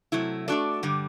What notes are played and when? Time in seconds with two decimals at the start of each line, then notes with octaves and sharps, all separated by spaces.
0.12 C3 F#3 A3 E4
0.48 A3 D4 F#4 A4 D5
0.83 G2 D3 G3